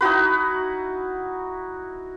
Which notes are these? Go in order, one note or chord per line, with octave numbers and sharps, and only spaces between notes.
D#4 E4 F#4 B4